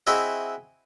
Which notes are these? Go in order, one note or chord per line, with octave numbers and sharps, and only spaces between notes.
C4 E4 F#4 G#4 D#5 E5